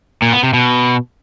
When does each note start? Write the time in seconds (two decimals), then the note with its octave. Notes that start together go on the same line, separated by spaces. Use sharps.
0.22 A#2
0.33 B3
0.43 C3
0.53 B2